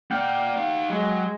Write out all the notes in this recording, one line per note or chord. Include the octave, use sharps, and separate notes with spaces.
A#3 D5 F#5 G5 F6
D#4 F5
F#3 G#3